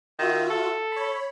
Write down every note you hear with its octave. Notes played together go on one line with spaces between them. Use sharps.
D#3 F4 F#4 E5
A4
C#5 B5